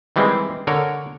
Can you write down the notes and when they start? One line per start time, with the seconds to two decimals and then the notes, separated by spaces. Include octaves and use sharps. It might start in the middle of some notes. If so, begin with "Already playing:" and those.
0.16 D#3 E3 G3 G#3 C4
0.67 D3 A#4 C#5